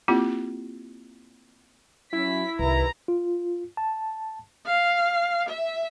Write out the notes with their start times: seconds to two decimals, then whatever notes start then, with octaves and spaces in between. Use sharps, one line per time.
0.08 A#3 C4 E4 F4 G4
2.13 F#3 C#4 E4 B6
2.59 C2 D#3 G4 B4 A#5
3.08 F4
3.77 A5
4.66 F5
5.49 E5